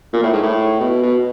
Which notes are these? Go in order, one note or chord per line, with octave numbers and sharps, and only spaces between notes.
A#2
A2
G#2
A2
B2
B2